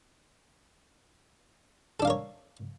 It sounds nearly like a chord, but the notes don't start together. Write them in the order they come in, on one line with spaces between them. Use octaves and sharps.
A4 D4 F5 A#4 C#5